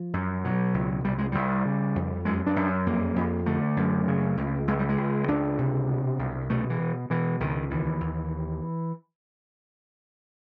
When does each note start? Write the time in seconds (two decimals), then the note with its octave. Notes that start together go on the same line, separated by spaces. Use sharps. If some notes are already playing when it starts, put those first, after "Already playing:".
Already playing: F3
0.13 F#2
0.44 B2 F#3
0.74 C#2
1.04 C2 G3
1.18 G#3
1.32 C2 G3
1.65 C#3
1.96 F2
2.25 F#2 G#3
2.47 D4
2.56 F#2
2.86 F2 A#3
3.16 F2
3.46 D3 A3
3.77 F#2
4.08 C#3
4.37 C#2
4.67 C#2 G#3
4.79 G3
4.89 G#3
4.98 C#2
5.28 C#2 D4
5.58 C3
5.90 B2
6.19 C2
6.49 B2 A3
6.70 E3
6.80 B2
7.10 B2 E3
7.40 C#2 D#3
7.70 D#2 E3
8.01 D#2